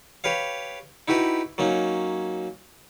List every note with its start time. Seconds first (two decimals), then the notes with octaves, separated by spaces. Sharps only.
0.24 G4 B4 C#5 F5
1.08 D#4 E4 F#4 G4 B4
1.58 F#3 A#3 C#4 D#4